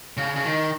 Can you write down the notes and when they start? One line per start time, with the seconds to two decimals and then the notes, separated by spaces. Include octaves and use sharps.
0.17 C#3
0.36 C#3
0.45 D#3